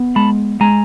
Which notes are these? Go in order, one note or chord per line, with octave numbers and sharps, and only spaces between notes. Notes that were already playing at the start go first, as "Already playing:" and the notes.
Already playing: B3
G#3 A5 B5
G#3 G#5 A#5